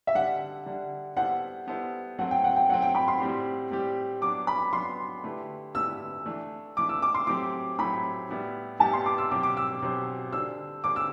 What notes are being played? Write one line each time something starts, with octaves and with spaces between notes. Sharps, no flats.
E5
D3 G3 D4 F#5
D3 G3 D4
G3 B3 E4 A4 C5 F#5
G3 B3 E4 A4 C5
F#3 A3 C4 F#5
G5
F#5
G5
F#3 A3 C4 F#5
G5
B5
C6
A2 G3 C4 G4
A2 G3 C4 G4
F#3 B3 D4 D6
B5
F#3 B3 D4 C6
D3 A3 E4 G4 B4
D3 A3 E4 G4 B4 E6
E3 A3 D4
E3 A3 D4 D6
E6
D6
C6
A2 F#3 A3 C4 G4 D6
A2 F#3 A3 C4 G4 B5
A2 G3 B3 E4 G4
A2 G3 B3 E4 G4 A5
C6
D6
E6
B2 F#3 C4 G4 C5 D6
D6
E6
B2 F#3 C4 G4 C5
D3 G3 D4 A4 C5 E6
D3 G3 D4 A4 C5 D6
E6